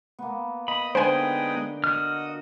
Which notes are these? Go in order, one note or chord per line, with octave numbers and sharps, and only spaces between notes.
A#3 B3
D#5 B5
D3 G#3 B3 D#4 C5 G5 G#5
F#4 D#5 F6